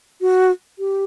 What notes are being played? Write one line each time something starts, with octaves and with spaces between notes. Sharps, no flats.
F#4
G4